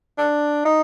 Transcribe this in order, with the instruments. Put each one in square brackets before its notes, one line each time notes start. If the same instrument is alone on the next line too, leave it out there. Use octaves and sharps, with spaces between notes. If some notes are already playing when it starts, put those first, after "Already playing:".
[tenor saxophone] D4
D#4